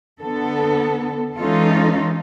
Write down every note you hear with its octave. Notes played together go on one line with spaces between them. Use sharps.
D3 B3 A4
E3 G#3 C#4 D#4 F4 A4